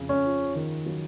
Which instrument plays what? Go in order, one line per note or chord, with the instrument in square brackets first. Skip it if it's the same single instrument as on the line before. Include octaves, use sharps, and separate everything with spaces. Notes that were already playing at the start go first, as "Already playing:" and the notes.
Already playing: [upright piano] F2 C#3
[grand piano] C#4
[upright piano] F3
D#3
F#3